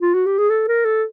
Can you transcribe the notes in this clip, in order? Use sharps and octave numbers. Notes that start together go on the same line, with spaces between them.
F4
F#4
G4
G#4
A4
A#4
A4